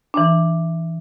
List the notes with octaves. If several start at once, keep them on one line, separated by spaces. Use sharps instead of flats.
E3 D4